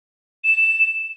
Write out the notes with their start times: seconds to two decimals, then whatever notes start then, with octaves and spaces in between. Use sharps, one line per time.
0.44 E7